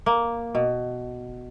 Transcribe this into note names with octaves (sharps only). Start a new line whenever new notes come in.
A#3
B2